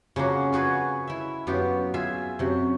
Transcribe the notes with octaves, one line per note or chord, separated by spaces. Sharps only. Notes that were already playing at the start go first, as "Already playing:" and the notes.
C#3 F3 A#3 F#4
F4 F#4 G#4 B4
E4 E5
F#2 B3 F4 G4
F4 G#4 E5
F#2 C3